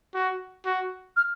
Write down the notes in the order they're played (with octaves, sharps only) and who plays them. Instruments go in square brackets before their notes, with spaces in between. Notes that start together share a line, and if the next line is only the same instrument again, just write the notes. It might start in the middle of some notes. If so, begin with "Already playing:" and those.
[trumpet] F#4
F#4
[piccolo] F6